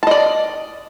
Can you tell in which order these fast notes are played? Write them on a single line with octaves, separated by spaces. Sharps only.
A5 D#5 D5